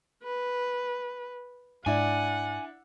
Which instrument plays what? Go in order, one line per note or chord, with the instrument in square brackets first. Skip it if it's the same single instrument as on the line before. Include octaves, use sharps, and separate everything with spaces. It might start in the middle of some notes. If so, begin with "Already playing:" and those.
[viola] B4
[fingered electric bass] G#2 [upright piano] D4 E4 D5 [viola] F#5 [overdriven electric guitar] G#5